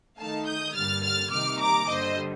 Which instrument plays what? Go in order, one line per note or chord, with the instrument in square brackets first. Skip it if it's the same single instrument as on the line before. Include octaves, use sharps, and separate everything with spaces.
[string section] D#3 A3 D#4 F5 A5
D#6 G6
G2 D3 G3 A#3 F6 A6
F6 A6
C3 D#3 G3 A#3 D#4 D6 F6
A#5 D6
G2 D3 G3 C5 D#5